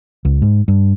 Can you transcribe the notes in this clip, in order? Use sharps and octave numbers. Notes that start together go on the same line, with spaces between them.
C#2
G#2
G2